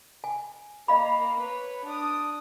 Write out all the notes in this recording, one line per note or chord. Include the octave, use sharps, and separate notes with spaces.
G#5
A#3 D#5 F5 B5
B4 C#5
D4 D#6